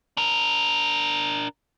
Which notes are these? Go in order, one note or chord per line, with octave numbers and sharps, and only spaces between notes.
D4 A#4